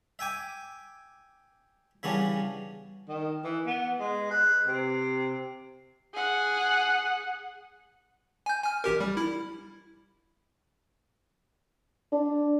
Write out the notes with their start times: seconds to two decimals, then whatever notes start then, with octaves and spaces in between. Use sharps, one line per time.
0.19 E5 G5 G#5 D6
2.03 C#3 E3 G3 B3 C#4 D4
3.09 D#3
3.44 E3
3.67 B3
4.00 G#3
4.31 B4
4.67 C3
6.13 G#4 F#5
8.46 G#5 G6
8.63 G#5 F6
8.84 A1 G4 A#4
9.00 G3
9.17 E4
12.12 D4